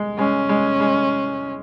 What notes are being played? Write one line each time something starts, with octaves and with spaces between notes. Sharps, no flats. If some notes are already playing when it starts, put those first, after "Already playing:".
Already playing: G#3
G#3 C#4
G#3
G#3